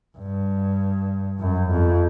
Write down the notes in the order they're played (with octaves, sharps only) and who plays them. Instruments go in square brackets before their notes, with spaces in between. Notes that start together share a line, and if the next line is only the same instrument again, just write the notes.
[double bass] G2
F#2
F2